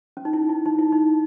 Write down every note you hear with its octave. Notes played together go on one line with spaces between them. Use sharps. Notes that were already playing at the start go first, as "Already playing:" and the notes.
C#4
D#4
E4
E4
D#4
E4
D#4